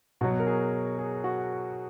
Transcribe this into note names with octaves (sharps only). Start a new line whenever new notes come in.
B2 F#3 F#4
A#4
G#4
G#4
F#4